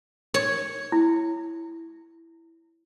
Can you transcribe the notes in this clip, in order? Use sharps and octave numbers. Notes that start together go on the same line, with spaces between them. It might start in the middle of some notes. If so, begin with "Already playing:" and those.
C#5
E4